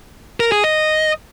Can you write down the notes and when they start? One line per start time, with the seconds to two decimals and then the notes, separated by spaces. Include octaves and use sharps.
0.40 A#4
0.52 G#4
0.64 D#5